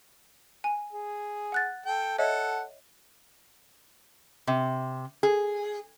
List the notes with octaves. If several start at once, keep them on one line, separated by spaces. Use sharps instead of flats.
G#5
G#4
F#5 F#6 A6
A4 G5
A4 C#5 D#5 E5 F#5
C3
G#4